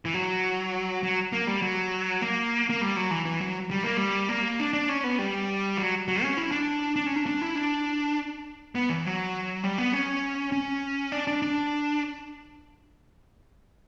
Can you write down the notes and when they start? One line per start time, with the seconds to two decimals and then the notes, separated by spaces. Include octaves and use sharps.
0.05 E3
0.14 F#3
1.03 F#3
1.33 A#3
1.47 G3
1.62 F#3
2.22 A#3
2.70 A#3
2.81 G3
2.97 F#3
3.11 E3
3.25 E3
3.41 F#3
3.71 G3
3.83 A#3
3.97 G3
4.29 A#3
4.60 D4
4.73 D4
4.89 C#4
5.04 B3
5.19 G3
5.78 F#3
6.08 F#3
6.23 C#4
6.37 E4
6.51 D4
6.96 D4
7.06 C#4
7.16 D4
7.27 D4
7.41 E4
7.55 D4
8.75 B3
8.89 E3
9.05 F#3
9.64 G3
9.78 B3
9.93 C#4
10.52 C#4
11.12 D4
11.27 D4
11.42 D4